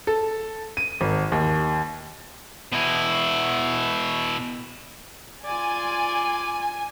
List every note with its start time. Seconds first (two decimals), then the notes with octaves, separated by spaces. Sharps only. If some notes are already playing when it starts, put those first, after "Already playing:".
0.07 A4
0.77 D#7
1.01 G#1
1.32 D#2
2.73 B2 E4
5.45 F4 D5 G#5